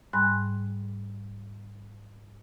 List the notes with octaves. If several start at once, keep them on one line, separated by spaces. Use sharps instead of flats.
G#2 G3 G#5 B5 C6 F#6